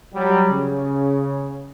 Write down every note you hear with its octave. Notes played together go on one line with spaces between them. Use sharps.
F#3 G3
C#3